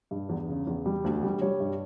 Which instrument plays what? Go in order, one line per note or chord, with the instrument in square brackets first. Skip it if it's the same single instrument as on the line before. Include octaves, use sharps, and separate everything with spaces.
[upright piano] G2
E2
C#3
E2
G3
D2
G3
G3 C#5
G2